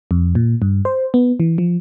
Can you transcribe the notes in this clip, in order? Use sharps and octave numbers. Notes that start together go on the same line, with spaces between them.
F2
A#2
G2
C5
B3
E3
F3